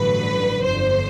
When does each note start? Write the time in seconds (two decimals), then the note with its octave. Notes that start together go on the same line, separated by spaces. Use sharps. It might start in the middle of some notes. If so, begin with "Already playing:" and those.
Already playing: A1 G2 D3 F#3 B4
0.63 G1 F2 D3 C5